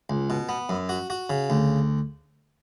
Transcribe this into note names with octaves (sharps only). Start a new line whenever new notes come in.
C#2
B2
B3
F#2
F#4
F#4
C#3
D2